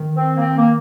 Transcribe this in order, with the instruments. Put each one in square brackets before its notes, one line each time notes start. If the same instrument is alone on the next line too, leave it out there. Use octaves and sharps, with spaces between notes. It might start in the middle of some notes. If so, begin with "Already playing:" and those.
Already playing: [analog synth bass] D#3
[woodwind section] C4
A#3
C4
A#3